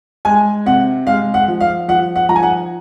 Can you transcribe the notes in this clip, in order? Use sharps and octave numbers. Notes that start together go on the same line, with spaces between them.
G#3 G#5
C3 F#5
G#3 F5
F#5
F3
F5
F3 F#5
F#5
F3 A#5
G#5
F#5